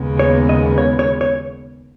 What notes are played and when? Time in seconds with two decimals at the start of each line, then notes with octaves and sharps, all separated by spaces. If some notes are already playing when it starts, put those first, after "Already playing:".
Already playing: D#2 C#3 G#3 B3
0.19 C#5
0.49 D#5
0.78 C#5
0.99 C#5
1.21 C#5